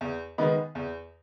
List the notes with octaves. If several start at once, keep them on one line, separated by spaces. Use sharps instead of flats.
E2
D#3 G#3 B3 D#4
E2